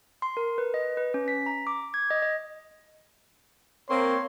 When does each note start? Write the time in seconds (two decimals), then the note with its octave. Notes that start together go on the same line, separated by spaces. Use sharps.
0.22 C6
0.37 A#4
0.58 B4
0.74 D#5
0.97 B4
1.14 C#4
1.28 B6
1.46 A#5
1.67 D6
1.94 G#6
2.10 D#5
2.22 D#5
3.90 A#3 C4 C#5 C6